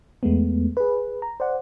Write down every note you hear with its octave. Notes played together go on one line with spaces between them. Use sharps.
E2 G#3 A3 B3
G#4 B4
A#5
C5 D5 F#5